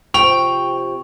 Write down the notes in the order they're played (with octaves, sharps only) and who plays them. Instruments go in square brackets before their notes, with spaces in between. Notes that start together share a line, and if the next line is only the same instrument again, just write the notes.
[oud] C3 F3 [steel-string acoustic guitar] G5 [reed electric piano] C#6 [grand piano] F7